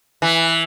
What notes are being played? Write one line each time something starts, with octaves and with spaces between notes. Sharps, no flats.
E3